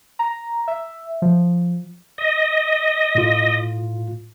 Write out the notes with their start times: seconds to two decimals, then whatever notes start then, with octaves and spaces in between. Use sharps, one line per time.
0.19 A#5
0.68 E5
1.22 F3
2.18 D#5
3.15 A2 F4